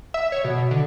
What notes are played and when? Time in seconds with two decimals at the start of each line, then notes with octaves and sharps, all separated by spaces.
0.14 E5
0.32 C#5
0.44 B2
0.71 D3